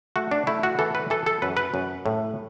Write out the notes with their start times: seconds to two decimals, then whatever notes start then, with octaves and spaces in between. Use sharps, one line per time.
0.16 A3 F#4
0.31 D4
0.47 A3 E4
0.63 F#4
0.79 E3 A4
0.95 B4
1.10 E3 A4
1.26 A4
1.42 F#2 B4
1.57 B4
1.74 F#2
2.06 A2